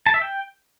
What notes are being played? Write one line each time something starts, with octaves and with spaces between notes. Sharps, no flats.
A5
E5
G5